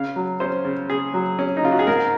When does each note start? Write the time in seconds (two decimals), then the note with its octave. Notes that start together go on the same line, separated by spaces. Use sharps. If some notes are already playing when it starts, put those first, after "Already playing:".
Already playing: C#3 F5
0.16 F#3
0.40 C#4 C5
0.65 C#3
0.90 C#3 G#4
1.14 F#3
1.39 C#4
1.57 D#4
1.63 C#3 F4
1.72 F#4
1.79 G#4
1.87 G#2 A#4